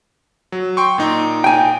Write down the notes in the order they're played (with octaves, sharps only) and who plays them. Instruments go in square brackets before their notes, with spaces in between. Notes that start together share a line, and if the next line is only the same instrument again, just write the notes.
[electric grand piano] F#3
G5 C6 C#6
A#2 D#4
[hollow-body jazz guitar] G5 G#5